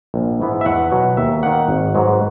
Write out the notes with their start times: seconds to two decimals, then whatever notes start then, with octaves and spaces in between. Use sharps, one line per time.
0.14 A#1
0.40 G#2 E3 B3
0.61 E5
0.65 E2 F#5
0.91 B2 F#3
1.17 D#2 E5
1.43 D#3 A#3 F#5
1.69 G#1
1.95 G#2 F#3 B3